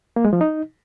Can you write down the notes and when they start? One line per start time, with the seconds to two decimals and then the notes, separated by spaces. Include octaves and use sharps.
0.16 A#3
0.25 G#3
0.33 F3
0.41 D#4